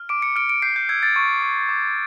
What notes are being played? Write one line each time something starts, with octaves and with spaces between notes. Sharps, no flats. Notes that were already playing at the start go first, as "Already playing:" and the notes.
Already playing: F6
D6 D7
C#7
F6 D7
D7
G6 C7
G6
E6 G#6
A6
C#6
C#6
D6